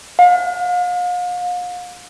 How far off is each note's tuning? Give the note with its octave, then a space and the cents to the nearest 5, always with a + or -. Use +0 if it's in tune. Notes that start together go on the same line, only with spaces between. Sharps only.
F5 +40